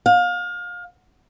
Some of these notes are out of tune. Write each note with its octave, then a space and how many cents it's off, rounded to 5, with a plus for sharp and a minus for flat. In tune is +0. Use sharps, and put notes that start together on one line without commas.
F5 +30